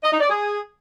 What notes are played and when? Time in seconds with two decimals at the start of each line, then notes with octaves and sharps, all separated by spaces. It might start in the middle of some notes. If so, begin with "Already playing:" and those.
0.02 D#5
0.11 D#4
0.20 D5
0.29 G#4